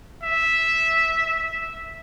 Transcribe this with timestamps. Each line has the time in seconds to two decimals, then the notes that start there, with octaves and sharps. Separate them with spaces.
0.23 E5
1.26 E5